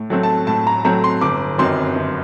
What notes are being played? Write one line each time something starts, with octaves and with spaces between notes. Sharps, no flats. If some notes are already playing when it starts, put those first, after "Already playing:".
Already playing: A2
F#3 A3 C4
A5
A2 A5
A#5
F#3 A3 C4 A#5
C6
G1 D6
F#2 D#3 F#3 C4 C6
G1